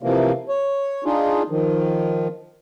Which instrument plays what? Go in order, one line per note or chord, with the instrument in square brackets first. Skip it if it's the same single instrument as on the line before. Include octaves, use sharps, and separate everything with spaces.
[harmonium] C3 E3 F3 A#3
C#5
D4 D#4 F4 G#4
D#3 F3